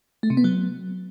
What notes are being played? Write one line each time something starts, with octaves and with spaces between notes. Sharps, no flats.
A3
C3
B3
F#3